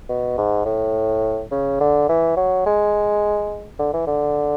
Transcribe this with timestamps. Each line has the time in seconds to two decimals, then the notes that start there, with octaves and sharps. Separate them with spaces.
0.09 B2
0.38 G#2
0.65 A2
1.51 C#3
1.81 D3
2.09 E3
2.37 F#3
2.66 G#3
3.79 D3
3.94 E3
4.07 D3